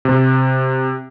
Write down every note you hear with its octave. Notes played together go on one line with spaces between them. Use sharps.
C3